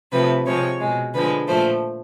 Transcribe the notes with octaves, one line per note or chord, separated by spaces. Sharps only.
C3 F3 A3 B4
C3 F3 G#3 C#5
B2 G#3
D3 F3 G#3 B4
A#2 F3 A3 C5